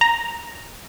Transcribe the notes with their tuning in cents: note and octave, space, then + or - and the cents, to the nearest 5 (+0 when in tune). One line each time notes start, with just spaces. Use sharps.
A#5 +5